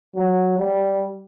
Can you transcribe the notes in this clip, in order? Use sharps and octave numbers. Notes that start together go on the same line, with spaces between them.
F#3
G3